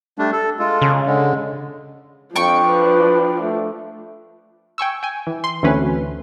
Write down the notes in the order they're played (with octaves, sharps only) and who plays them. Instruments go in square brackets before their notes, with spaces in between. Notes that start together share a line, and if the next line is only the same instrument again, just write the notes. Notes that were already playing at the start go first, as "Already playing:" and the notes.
[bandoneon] G3 A3 D4
A4
G#3 F4 A4
[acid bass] C#3
[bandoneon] D3 G#3
[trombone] F2 [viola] F3 D4 [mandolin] G5 C#6
[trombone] B4
A3
[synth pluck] G5 G#5 C#6 E6
G5 G#5
E3
C6
D2 E3 A3 C4 C#4 B4
D2